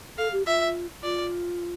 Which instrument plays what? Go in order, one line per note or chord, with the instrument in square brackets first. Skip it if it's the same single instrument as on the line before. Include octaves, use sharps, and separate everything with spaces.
[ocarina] A4 [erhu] F5
[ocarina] G4
[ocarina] F4 [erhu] E5
[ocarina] F4 [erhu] D5